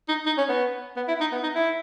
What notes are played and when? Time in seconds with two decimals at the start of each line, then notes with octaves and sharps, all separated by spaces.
0.08 D#4
0.26 D#4
0.38 C#4
0.49 B3
0.97 B3
1.08 E4
1.20 D#4
1.32 B3
1.43 D#4
1.55 E4